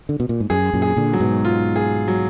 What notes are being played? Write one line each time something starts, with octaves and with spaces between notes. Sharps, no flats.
D3
B2
A#2
G#2
F#2 G#4
F#2 A#2
G#4
A#2 D3
F#3
G#2 B2
F4
G#4
F#3